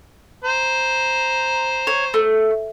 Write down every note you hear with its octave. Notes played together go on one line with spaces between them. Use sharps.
C5 A#5
C#5
A3